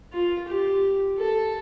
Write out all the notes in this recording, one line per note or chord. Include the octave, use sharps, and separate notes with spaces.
F4
G4
A4